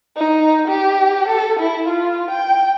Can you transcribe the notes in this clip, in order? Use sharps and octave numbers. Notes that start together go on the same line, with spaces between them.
D#4
G4
A4
E4
F4
G5